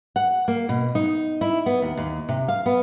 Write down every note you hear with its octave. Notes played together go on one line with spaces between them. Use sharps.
F#5
A#3
B2
D#4
E4
B3
D#2
D#2
C3
F5
B3